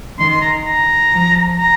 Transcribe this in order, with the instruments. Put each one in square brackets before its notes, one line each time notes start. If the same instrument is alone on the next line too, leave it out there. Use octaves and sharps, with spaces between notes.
[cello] D#3 [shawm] C6
[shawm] C6
A#5
A#5
[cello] F3
[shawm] A#5